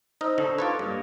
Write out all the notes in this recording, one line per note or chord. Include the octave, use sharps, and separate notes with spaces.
D#4 C5 D#5 E6 F6
D3 D#4 A4 C#6
F4 A4 B4 C#5 D5
G2 A#3 C#5 D#5